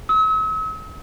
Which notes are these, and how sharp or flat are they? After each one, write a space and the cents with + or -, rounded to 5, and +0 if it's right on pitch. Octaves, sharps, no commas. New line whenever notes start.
E6 -45